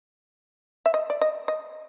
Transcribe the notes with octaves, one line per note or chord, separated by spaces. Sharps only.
E5
D#5
D5
D#5
D#5